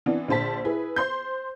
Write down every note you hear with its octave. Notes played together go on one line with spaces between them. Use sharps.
E3 B3 C4 D4
A#1 D3 C5 A5 B6
E4 G#4 B4
C5 C6 G6